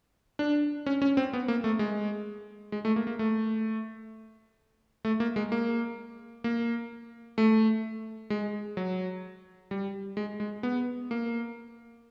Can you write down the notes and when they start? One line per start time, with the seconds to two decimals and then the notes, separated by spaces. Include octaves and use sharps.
0.39 D4
0.86 C#4
1.02 C#4
1.17 C4
1.33 B3
1.48 A#3
1.64 A3
1.79 G#3
2.72 G#3
2.85 A3
2.96 A#3
3.07 A#3
3.19 A3
5.05 A3
5.20 A#3
5.36 G#3
5.52 A#3
6.44 A#3
7.38 A3
8.30 G#3
8.77 F#3
9.71 G3
10.17 G#3
10.40 G#3
10.63 B3
11.11 A#3